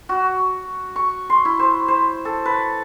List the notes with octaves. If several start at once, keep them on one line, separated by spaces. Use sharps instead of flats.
F#4
C#6
C6
E4
C5
C5
A4
B4